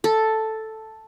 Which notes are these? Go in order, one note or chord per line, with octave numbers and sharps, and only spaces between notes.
A4